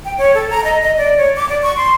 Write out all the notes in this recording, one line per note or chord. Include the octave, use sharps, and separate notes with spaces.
G5
C#5
A4
A#5
D#5
D#5
D5
C#5
D6
D5
C#6
C6